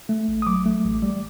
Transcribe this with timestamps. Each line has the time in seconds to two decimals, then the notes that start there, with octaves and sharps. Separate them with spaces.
0.09 A3
0.28 A1
0.42 D#6
0.47 F#3 D6
0.66 A3
0.84 A1
1.02 G3